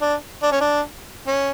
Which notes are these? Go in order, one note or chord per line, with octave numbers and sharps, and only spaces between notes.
D4
D4
C#4
D4
C#4